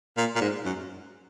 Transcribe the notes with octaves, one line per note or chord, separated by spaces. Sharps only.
A#2
A#2
G#2
F#2